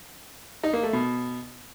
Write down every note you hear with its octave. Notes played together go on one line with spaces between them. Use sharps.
D#4
A#3
A3
B2